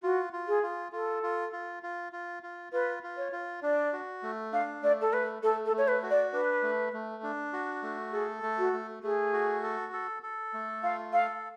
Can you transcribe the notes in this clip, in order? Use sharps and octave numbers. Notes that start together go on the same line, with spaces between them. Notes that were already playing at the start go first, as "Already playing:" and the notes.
F4 F#4
F4
G#4
F4
F4 A4
F4
F4
F4
F4
F4
F4 B4
F4
C#5
F4
D4 D5
F#4
A3
D4 F5
A3 D5
A4
A3 B4
A3 A4
A4
A3
C#5
B4
F#4
D5
D4 B4
A3
A3
D4
F#4
A3
G#4 A4
A3
F#4
A3
A3 G#4
F#4
A4
A4
A4
A3
F4 F5
A4 F5